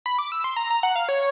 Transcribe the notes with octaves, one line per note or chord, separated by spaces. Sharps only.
B5
D6
E6
C6
A#5
A#5
F#5
F5
C#5